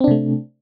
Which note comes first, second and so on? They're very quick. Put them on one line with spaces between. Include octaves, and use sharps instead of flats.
C4 D4 C3 A3